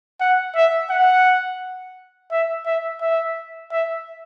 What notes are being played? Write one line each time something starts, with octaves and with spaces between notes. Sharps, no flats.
F#5
E5
F#5
E5
E5
E5
E5